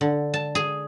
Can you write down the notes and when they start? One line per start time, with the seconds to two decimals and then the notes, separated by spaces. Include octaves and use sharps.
0.01 D3
0.34 A5
0.55 G#4